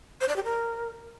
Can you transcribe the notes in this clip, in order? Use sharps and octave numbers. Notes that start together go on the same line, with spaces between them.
C5
D5
G4
A#4